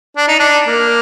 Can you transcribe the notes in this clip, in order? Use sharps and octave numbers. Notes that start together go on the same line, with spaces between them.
D4
D#4
D4
A#3